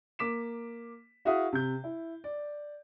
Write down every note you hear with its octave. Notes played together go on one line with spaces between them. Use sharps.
A#3 D6 B6 E7
E4 F#4 G#4 E5 F5 D#6
C3 G6
E4
D5